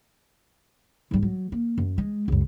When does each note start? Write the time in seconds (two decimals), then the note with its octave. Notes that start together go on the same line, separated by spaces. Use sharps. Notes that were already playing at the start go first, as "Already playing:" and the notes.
1.11 G#2 G3
1.22 F#3
1.52 A#3
1.78 F#2
1.98 G#3
2.28 C#2 F#2